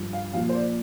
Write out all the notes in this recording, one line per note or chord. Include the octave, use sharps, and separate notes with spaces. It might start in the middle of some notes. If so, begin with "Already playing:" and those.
Already playing: G2 F3
F5
A#2 F3 F5
C5
D5